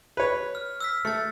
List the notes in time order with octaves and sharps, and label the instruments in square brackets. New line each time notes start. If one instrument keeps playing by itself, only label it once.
[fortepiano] B4 C#5
[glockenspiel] F6
E6 F6 B6
[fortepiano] A3 [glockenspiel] A6 C#7